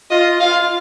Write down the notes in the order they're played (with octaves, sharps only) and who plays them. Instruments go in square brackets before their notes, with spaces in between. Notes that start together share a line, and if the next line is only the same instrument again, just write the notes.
[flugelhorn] F4 [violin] D#5
[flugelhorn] F4 [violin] F5